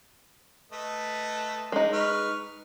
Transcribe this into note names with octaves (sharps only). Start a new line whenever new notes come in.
A3 B4 D#5
G#3 D#4
B4 C#6 F6